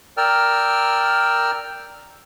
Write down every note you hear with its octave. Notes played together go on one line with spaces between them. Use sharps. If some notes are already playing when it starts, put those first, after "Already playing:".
A#4 D5 G5 E6 F6